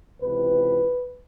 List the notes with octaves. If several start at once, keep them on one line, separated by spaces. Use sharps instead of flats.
C#2 C3 E3 B4